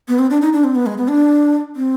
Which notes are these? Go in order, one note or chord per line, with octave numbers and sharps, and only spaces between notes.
B3
C4
D4
D#4
D4
C4
B3
G#3
B3
D4
C4